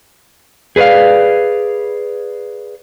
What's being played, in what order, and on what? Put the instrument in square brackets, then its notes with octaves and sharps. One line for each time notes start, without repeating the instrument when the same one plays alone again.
[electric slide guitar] G#4 B4 C#5 D5 F5